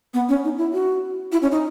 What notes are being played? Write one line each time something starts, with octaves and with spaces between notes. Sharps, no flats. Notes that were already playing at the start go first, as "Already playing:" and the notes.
B3
C#4
D#4
E4
F#4
E4
C#4
D#4